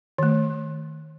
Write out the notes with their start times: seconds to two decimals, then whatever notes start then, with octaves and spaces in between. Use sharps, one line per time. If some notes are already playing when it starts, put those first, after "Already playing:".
0.18 D#3 A3